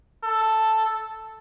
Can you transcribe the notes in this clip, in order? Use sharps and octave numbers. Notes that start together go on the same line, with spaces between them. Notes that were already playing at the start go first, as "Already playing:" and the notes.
A4